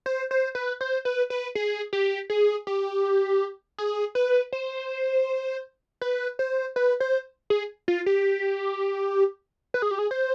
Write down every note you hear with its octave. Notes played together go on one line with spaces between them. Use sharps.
C5
C5
B4
C5
B4
B4
G#4
G4
G#4
G4
G#4
B4
C5
B4
C5
B4
C5
G#4
F4
G4
B4
G#4
G4
G#4
C5